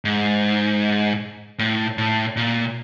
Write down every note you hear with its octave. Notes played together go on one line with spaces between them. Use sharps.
G#2
A2
A2
A#2